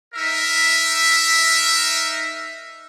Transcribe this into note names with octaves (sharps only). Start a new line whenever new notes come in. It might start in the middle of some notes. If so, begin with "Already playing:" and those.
D#4 A#4 E5